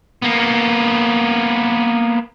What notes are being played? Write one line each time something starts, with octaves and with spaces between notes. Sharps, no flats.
A#3 B3